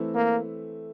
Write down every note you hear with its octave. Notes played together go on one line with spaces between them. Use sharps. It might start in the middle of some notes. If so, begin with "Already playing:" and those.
Already playing: E3 A3 C4 E4
A#3